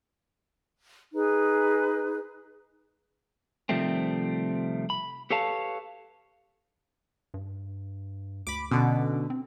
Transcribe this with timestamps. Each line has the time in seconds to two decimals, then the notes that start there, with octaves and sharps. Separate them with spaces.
1.13 D#4 G#4 B4
3.69 C3 D#3 F3 G3 A3 C4
4.90 B5
5.30 G4 A4 B4 C#5 F5 A5
7.34 G2
8.47 D2 B5 D6
8.71 B2 D3 C#4
9.30 C4